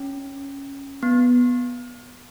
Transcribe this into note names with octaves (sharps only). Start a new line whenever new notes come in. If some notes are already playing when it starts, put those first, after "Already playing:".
Already playing: C#4
B3